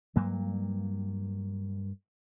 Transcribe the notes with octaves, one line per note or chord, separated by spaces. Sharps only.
G2 F#3 A#3